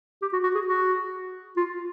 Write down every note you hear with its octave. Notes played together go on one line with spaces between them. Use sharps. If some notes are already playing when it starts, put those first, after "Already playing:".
G4
F#4
F#4
G#4
F#4
F4